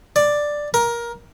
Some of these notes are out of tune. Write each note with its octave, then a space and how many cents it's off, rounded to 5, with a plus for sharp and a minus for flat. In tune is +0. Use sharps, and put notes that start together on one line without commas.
D5 +5
A#4 +15